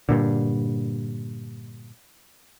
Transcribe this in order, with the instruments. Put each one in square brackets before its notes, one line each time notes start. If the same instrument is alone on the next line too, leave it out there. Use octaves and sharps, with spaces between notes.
[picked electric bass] G2 A#2 D3